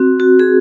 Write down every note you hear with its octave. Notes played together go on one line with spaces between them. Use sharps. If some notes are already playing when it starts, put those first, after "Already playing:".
Already playing: C4 F#4
F#4
G#4